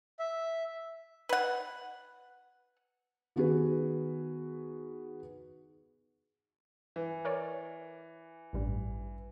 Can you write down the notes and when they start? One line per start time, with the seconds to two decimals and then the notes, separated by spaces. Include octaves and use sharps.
0.19 E5
1.29 B4 F#5
3.36 D#3 B3 F#4 G#4 B4
6.96 E3
7.25 A#4 C#5 D5
8.53 A1 G2 G3